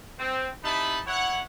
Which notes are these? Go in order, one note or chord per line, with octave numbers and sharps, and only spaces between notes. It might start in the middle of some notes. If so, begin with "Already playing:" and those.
C4
C3 D#4 E4 A5 B5
E4 C#5 E5 F#5